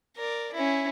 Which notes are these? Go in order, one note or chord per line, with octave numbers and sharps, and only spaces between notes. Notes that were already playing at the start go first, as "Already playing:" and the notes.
A#4 D5
C#4 E4